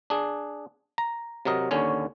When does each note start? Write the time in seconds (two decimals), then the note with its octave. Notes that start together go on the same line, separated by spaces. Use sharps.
0.10 D4 G#4
0.98 A#5
1.45 C3 F#3 A#4 D#5
1.71 D#2 D3 C#4 C#5